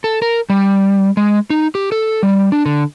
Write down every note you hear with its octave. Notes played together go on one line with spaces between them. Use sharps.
A4
A#4
G3
G#3
D#4
G4
A4
G3
D4
D3